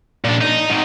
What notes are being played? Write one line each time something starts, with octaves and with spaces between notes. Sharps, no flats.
A#2 D4
D#4
G#2 D#3